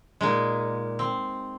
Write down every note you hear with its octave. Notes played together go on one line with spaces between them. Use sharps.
A#2 G#3 D#4
C4